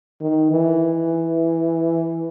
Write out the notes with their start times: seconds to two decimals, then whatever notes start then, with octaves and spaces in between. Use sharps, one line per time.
0.21 D#3
0.51 E3